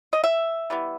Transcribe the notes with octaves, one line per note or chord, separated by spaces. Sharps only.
D#5
E5
E3 G3 B3